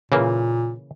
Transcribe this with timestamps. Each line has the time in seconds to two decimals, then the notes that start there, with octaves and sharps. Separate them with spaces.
0.12 A#2 C#3 E3 A#3